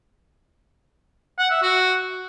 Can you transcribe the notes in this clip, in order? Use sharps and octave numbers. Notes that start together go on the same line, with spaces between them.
F#5
E5
F#4